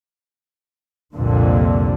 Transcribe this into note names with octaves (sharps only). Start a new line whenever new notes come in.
C2 F2 A#2 D3